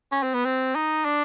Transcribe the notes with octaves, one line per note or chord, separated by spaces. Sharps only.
C#4
C4
B3
C4
D#4
D4